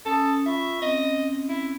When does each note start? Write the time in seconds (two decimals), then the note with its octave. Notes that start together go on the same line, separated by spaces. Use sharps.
0.06 C#4 A4 D#6
0.46 F4 E5 B5 C#6
0.82 C4 C#4 D#5
1.49 E4